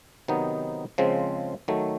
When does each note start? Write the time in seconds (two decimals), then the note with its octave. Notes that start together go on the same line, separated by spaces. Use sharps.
0.28 C3 D#3 F#3 B3 D#4
0.98 C#3 F3 G#3 C4
1.68 D#3 F#3 A3